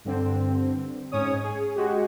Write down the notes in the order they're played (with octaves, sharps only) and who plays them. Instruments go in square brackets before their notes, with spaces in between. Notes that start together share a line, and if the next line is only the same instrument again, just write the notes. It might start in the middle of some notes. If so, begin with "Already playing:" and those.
[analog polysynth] G2 D3 C4
G#2 C#4 C#5 D#6
G#4
G#3 F#4 G4